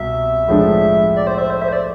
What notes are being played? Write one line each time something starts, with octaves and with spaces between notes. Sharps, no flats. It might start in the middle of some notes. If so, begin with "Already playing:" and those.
Already playing: C2 B2 E5
A2 F3 G#3 D4
D5
C5
E5
C5
E5
C5
D5